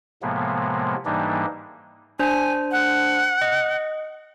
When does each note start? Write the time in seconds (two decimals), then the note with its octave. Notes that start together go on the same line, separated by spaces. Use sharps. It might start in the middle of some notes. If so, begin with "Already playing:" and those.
0.22 A2 C3 F3 G#3 A#3 B3
1.05 G#2 E3 G3 A#3 D4 D#4
2.19 D4 C5 G#5
2.72 F#5
3.42 D#5